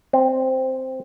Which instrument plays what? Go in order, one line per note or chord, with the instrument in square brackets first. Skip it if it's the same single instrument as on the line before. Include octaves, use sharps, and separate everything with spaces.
[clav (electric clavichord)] C4